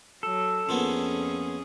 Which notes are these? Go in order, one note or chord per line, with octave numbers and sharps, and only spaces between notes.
F#3 A4
F2 F3 A#3 B3 C#4 G#4